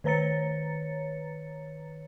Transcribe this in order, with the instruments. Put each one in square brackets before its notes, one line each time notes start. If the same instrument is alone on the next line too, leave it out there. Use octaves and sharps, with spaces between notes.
[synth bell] D#3 B4 C#5 A#5 A6 C#7